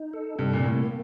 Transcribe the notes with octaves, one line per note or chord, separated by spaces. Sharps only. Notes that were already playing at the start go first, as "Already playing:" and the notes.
Already playing: D#4
A4
G2 C3
A#2
A2 A#3